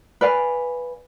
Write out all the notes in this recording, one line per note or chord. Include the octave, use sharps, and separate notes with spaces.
B4 D5 F5 G#5